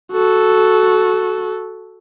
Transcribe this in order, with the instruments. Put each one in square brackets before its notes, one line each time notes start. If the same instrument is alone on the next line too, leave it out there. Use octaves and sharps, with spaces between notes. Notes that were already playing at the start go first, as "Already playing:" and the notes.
[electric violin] F#4 A4